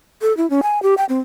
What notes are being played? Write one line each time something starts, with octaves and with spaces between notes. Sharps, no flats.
A4
E4
C#4
G#5
G4
G5
C4